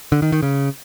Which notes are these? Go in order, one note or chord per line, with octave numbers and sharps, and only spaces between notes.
D3
D#3
D#3
C#3